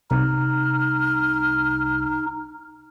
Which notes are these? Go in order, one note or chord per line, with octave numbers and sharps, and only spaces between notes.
C2 D#4 F6